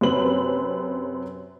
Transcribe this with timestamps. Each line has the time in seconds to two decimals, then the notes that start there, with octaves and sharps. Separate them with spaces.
0.01 F#2 C3 C4 B4 F#7